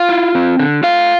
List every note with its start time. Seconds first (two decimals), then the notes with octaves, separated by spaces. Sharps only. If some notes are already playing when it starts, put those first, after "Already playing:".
Already playing: F4 F5
0.09 E4
0.35 C4
0.59 D3
0.83 A3 F4 F5